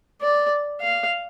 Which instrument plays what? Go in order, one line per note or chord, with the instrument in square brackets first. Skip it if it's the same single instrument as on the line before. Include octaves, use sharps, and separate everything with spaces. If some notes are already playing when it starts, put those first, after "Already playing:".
[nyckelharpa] D5
F5